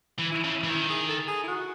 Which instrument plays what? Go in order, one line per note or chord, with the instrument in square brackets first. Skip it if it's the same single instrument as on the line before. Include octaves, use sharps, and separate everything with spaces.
[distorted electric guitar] E3
[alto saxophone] E4
[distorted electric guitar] C#3
E3
[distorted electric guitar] D#3 [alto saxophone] E4
[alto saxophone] G#4
A4
G#4
E4
F#4